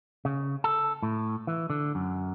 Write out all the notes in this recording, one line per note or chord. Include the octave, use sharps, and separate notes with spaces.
C#3
A4
A2
E3
D3
F#2